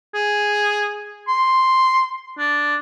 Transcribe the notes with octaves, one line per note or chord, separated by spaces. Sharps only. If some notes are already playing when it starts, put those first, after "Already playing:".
G#4
C6
D4